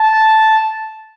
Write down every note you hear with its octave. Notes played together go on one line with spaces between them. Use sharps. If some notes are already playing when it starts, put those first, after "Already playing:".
Already playing: A5